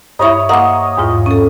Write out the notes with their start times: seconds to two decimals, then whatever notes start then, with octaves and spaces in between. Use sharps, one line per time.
0.19 G2 E4 C#5 D#5 B5
0.49 A#3 D#5 F#5 C6 D6
0.97 E2 G#2 F4
1.26 C#4 A4